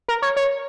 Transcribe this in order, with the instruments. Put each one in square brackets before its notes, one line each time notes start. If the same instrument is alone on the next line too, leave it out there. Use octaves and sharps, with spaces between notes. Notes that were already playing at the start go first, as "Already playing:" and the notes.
[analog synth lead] A#4
C#5
C#5